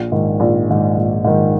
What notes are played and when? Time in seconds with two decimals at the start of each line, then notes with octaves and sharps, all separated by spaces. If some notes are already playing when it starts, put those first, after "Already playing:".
Already playing: A#1
0.12 G#2 D#3
0.40 A#1
0.68 G#2 D#3
0.97 A#1
1.25 G#2 D#3